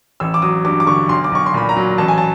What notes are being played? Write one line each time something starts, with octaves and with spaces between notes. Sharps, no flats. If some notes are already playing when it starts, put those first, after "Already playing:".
A1 E6
D6
F#3 D#6
G2 D6
D6
D3 C#6
B1 C6
D6
B1 C#6
C6
A#2 B5
A#5
F#3
A1 A5
G#5
A5